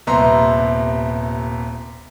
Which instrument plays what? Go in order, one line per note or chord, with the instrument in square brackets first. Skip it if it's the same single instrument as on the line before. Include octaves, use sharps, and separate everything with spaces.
[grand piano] D#1 C3 B3 E5 A#5 C6